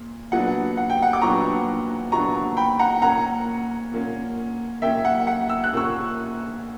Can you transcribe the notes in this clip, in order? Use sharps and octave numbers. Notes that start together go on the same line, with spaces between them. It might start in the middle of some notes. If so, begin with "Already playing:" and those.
Already playing: A#2
A#2 F#3 B3 D4 F#5
F#5
G5
F#5
D6
A#2 F#3 B3 D4 A#5 C#6
A#2 F#3 B3 D4 A#5 C#6
G5 B5
F#5 A#5
A#2 A#3 C#4 F#5 A#5
A#2 A#3 C#4
A#2 A#3 C#4 E5 G5
F#5
F#5
E6
F#6
A#2 A#3 C#4 C#6 E6